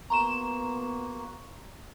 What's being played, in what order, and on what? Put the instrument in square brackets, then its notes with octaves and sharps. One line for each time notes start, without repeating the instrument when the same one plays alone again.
[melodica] A#3 F#4 [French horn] B3 [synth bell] A#5 C6 E7